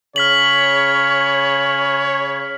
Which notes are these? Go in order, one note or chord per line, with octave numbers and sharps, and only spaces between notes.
C#3 C#5 F6 B6 F#7